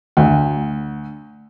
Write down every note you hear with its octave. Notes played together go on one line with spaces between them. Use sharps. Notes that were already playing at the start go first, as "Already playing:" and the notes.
D2